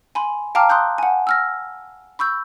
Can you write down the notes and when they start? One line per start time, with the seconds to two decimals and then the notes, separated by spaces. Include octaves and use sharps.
0.15 G#5 B5 C6
0.55 F5 G5 A5 A#5 D6 F6
0.69 C6 D#6 F#6 G6
0.98 F#5 G#5
1.27 E6 F6 A#6
2.19 B5 C#6 E6 G6